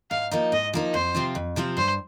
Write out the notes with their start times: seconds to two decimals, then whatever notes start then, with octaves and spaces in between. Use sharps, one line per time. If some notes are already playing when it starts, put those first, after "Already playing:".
0.11 G#2 F5
0.31 F3 A#3 D#4
0.52 G#2 D#5
0.74 F3 A#3 D#4
0.94 F2 C5
1.15 C3 F3 C4 F4
1.35 F2
1.56 C3 F3 C4 F4
1.77 G2 C5